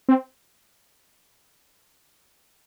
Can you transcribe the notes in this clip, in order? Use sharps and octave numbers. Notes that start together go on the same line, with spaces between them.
C4